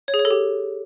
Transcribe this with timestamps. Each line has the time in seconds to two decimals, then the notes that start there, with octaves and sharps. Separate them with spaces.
0.08 C#5
0.14 G#4
0.19 C#5
0.25 A4
0.31 G4